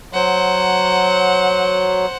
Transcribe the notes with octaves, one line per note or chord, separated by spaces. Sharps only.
F#3 C5 F#5